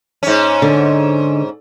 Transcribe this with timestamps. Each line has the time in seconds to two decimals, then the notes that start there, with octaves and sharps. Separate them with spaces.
0.23 G#2 C#4
0.62 D3